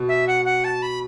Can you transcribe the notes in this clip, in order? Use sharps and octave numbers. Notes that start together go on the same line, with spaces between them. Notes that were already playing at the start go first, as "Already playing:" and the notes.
Already playing: B2
E5
F#5
F#5
A5
B5